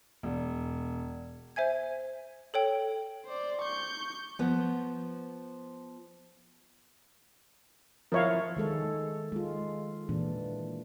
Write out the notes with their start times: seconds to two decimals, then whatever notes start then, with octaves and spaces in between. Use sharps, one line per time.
0.23 E1
1.56 C5 E5 G#5 G#6
2.54 A4 C#5 G5
3.26 C5 D5
3.62 C#6 G6
4.39 F3 B3
8.12 F3 E4 A#4 C#5 F5
8.56 D#3 G#3 A4
9.32 G#3 F4
10.09 A#2 E3 D4